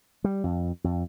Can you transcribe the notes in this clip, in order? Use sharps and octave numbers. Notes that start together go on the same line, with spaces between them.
G3
F2
F2